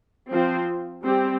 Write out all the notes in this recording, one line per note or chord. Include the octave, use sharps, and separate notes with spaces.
F3 C4 F4 C5
G3 C4 G4